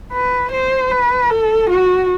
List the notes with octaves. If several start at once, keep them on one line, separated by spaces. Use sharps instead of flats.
B4
C5
B4
A4
F#4